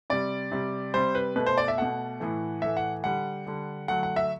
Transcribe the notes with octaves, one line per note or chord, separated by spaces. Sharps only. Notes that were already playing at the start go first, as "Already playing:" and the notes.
C3 G3 D5
C3 G3
C3 G3 C5
B4
B2 A3 B4
C5
D5
E5
B2 A3 F#5
A2 E3 A3
A2 E3 A3 E5
F#5
D3 G3 F#5
D3 G3
D3 F#3 A3 F#5
F#5
E5